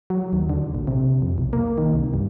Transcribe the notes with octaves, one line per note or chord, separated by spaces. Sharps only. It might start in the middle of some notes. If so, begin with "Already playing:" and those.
F#3
D#2
D3
A#1
C3
F2
B1
A#3
D#3
C2
G2